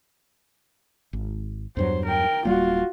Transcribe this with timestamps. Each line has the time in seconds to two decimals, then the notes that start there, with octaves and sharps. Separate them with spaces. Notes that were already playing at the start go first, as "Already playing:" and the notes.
1.13 G#1
1.77 E2 G2 F#3 C5
2.05 A#4 G5
2.45 D1 G3 A#3 F4 F#4